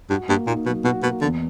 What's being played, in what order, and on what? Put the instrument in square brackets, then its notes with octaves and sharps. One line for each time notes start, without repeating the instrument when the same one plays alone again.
[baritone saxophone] G2 [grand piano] F#4
[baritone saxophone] G2 [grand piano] A#3
[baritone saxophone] A#2 [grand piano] D#4
[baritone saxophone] B2 [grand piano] F#3
[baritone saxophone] B2 [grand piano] F#4
[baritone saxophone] B2 [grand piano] A#3
[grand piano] E2 [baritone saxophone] D3